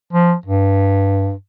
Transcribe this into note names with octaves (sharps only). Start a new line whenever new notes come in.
F3
G2